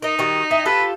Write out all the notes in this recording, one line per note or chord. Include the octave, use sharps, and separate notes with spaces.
D#4 A#4 D#5
D#3 G3 F#4
E4 G5
F4 G4 A4 B4